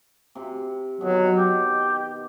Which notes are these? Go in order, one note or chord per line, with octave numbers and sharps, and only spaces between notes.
C3 C6
B2 D#3 F#3
G4